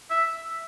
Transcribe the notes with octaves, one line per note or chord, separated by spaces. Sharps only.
E5